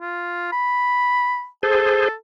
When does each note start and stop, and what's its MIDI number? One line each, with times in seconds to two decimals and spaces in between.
0.01 0.50 65
0.52 1.47 83
1.63 2.08 68
1.63 2.13 69
1.63 2.08 72